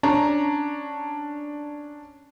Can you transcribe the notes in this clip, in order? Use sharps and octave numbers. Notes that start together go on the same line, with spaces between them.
C#4 D4 C#5 A#5